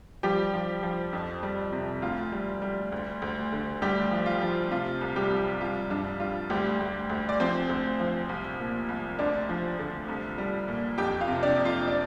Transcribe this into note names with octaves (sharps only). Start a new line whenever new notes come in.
F3 G3 G4
F3
F3
F2
G3
C3
D2 F4
G3
G3
D2
D2
D3
D2 G3 G4
F3
F4
F3
C3 F4
C2
G3 G4
C2
G3 F4
G2 D4
G3 F4
D2 G3 G4
D2
D2
D5
F3 C4 C5
D2
F3
C2
A#2
C2
D2 D4 D5
F3
D3
C2
G3
A#2
F2 G4 G5
F4 F5
C3
D4 D5
F2
F4 F5
D4 D5